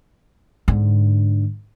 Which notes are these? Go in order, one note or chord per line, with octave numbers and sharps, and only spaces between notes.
G#2 D3